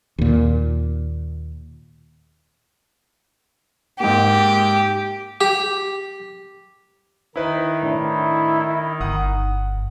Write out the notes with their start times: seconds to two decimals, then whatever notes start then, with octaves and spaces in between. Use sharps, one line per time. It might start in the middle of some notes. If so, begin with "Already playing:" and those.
0.18 D#2 A#2
4.00 G#2 A#3 G4
5.41 G4
7.36 D#3 D#4 E4 B4 D#5
7.83 A2 D4 E4
9.01 G1 F#5 D#6